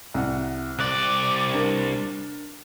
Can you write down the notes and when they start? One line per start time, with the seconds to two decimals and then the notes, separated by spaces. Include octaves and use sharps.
0.14 C2 F#5
0.79 C2 D5 F#6
1.54 D4 A#4